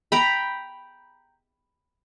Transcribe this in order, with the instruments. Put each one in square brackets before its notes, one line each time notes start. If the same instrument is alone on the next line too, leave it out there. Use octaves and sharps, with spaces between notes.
[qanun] G5 A#5 B5